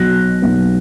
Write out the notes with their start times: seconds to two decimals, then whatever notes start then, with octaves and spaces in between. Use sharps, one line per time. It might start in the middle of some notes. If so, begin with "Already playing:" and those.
Already playing: B1 B2 F#3 B3 F#6 A#6
0.42 B1 B2 F#3 B3